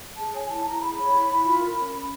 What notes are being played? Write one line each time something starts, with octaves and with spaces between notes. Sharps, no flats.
G#4 A5
C#5 G#5
E4 A5
E4 A#5
G#4 B5
C#5
E4
E4
F4
A#4
C#4
C#4